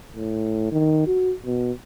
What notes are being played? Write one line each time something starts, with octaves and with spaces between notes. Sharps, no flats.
A2
D#3
F#4
B2